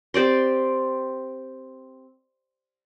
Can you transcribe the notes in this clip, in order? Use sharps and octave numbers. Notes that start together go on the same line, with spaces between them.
C4 G4 D5 C6